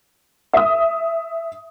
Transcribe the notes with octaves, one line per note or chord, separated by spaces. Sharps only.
E5 D#6